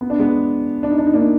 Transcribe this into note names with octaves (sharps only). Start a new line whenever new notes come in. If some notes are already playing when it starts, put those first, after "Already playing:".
B3
D4
G#3 B3
D4
D#4
D4
D#4
A#3 D4